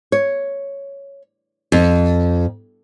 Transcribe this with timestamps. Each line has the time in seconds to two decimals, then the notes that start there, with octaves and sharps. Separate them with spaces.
0.12 C#5
1.72 F2